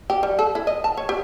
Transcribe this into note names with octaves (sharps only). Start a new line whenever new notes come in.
G4
G3
A4
E4
D#5
A5
C#5
G4